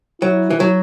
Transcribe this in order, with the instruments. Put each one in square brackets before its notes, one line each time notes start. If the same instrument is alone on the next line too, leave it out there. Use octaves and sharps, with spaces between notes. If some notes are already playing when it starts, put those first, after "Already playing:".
[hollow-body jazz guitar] F#3 [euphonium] E4
[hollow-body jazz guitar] E3
F#3